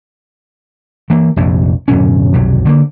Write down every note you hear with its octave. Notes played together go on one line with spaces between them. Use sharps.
E3 A#3
F1 A#1 F2
D1 F#2 B2 C#4
F1 B1 C3 F#3
D3 A3 A#3